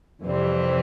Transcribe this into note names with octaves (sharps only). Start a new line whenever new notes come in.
F2 C3 E3 G3 C4